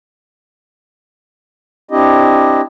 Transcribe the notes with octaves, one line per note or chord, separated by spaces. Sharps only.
C4 D4 E4 G4 D#5